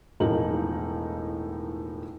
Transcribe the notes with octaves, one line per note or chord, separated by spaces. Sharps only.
E1 A2 F3 D#4 A#4 F#7